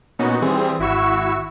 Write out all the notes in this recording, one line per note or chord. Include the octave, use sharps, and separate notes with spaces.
A#2 B3 C#4 D#4 F#4
E3 G3 C4 G#4
G#1 E4 F#4 C#6 E6